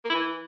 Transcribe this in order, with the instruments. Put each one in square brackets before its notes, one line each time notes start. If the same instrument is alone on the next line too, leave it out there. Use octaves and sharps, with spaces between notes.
[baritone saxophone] A#3
E4
E3